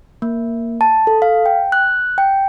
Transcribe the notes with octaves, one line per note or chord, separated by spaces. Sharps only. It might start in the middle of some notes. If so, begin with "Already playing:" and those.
A#3
A5
A4
F5
G5
F#6
G5